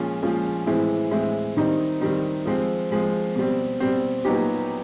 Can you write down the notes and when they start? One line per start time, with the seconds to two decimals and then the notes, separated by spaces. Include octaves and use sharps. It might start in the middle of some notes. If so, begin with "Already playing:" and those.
Already playing: A#2 F3 G#3 C#4 F4
0.22 A#2 F3 G#3 C#4 F4
0.66 A2 E3 G#3 C4 E4
1.11 A2 E3 G#3 C4 E4
1.57 D#3 G3 C4 D#4
2.01 D#3 G3 C4 D#4
2.45 F3 G#3 C4
2.91 F3 G#3 C4
3.36 B2 G3 C4
3.80 B2 G3 C4
4.25 A#2 F#3 B3 D#4 G4